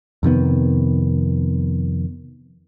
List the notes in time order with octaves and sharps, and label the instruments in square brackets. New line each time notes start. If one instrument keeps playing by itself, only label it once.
[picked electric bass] F2 C3 D#3 B3